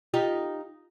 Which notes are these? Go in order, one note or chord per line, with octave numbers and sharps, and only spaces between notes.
D#4 F4 G4